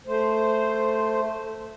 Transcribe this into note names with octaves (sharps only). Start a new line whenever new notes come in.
A3 C5